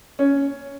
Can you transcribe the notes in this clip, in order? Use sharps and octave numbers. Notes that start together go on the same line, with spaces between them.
C#4